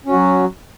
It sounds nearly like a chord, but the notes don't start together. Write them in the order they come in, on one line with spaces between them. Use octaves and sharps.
C#4 F#4 F#3